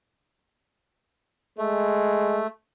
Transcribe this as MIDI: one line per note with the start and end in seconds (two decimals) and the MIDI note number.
1.58 2.43 56
1.58 2.47 57